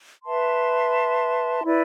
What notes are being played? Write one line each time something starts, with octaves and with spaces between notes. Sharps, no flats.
B4 E5 A5 C6
E4 B4 D5